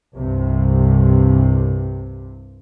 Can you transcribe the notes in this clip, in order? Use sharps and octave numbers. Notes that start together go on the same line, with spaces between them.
C2 G2 C3